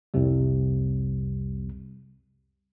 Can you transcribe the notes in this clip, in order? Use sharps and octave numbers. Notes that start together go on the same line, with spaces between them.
C2 F2 C3 G3